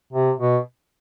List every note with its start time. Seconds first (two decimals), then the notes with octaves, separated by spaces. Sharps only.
0.13 C3
0.39 B2